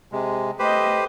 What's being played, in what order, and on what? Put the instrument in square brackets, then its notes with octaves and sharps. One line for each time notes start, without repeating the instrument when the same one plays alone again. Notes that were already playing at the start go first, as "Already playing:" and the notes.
[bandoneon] C3 G#3
[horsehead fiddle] A3 D#5 [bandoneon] G4 B4 C5